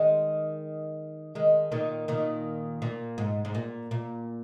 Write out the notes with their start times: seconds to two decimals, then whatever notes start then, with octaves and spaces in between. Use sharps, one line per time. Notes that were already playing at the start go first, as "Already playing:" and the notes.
Already playing: D#3 G#3
1.35 D#3 G#3
1.72 A#2 D#3
2.08 A#2 D#3
2.82 A#2
3.18 G#2
3.45 G#2
3.55 A#2
3.91 A#2